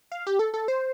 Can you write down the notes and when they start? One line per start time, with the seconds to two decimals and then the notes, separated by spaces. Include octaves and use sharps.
0.12 F5
0.27 G4
0.39 A4
0.54 A4
0.68 C5